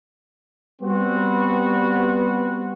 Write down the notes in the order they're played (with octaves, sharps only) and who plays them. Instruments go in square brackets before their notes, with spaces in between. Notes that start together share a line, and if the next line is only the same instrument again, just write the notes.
[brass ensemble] G3 B3 C4 F#4